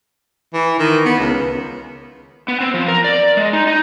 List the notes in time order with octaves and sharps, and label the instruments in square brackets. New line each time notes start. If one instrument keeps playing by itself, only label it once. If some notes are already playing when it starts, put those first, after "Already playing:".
[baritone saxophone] E3
D#3
B3
C#2
[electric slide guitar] B3
C4
F3
A#4
D5
G#3
D#4
D#4